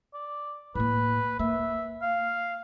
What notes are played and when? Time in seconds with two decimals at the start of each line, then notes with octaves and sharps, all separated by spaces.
0.14 D5
0.75 A2 A#3 B4
1.39 A#3 E5
2.02 F5